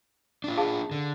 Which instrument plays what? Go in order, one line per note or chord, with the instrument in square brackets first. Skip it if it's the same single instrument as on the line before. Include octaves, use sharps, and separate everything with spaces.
[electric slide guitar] D4 F4
[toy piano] G#4 F5 A5
[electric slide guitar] D3